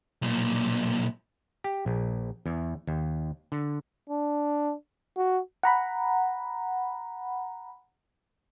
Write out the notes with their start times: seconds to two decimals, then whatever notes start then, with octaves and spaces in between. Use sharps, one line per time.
0.22 B1 A#2
1.64 G4
1.86 A#1
2.46 E2
2.87 D#2
3.52 D3
4.09 D4
5.17 F#4
5.63 F#5 A#5 B5